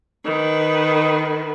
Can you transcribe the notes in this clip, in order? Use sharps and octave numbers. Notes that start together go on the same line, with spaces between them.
D#3 B4